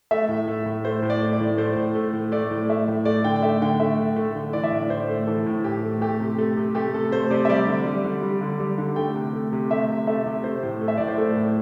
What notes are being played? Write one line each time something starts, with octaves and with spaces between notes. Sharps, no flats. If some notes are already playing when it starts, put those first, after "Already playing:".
A3 E5
A2
A3
A2
A3 C5
A2
D5
A3
D5
A2
A3 C5
A2
A3
A2
A3 D5
A2
A3 E5
A2
A3 D5
D3 G5
G5
A3 E5
D3 G5
A3 E5
D3
A3
D3
E3 D5
E5
A2 D5
A2 C5
A3
E3 A4
A2
A2 G4
A3
A3 G4
C3
A3
C3
A3 G4
C3 A4
A3 C5
C3 D5
E5
G3 D5
D3
G3
D3
G3
D3
G3
D3
A3 G5
C3
A3
C3
A3 E5
C3
A3 E5
C3
A3 C5
A2
A3
E5
A2 D5
C5
A3 A4
A2